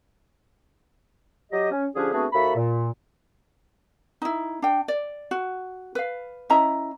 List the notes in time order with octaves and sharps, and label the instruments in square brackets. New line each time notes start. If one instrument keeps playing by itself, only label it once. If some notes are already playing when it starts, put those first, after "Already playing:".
[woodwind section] F#3 G4 D#5
C#4
D3 F3 C#4 D4 G4 G#4
A3 B3 C4 D4 F#4 G#4
D#2 A#3 F#4 A4 E5 B5
A#2
[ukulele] D#4 E4
D4 G5
D5
F#4
B4 F5
C#4 E4 D#5 A#5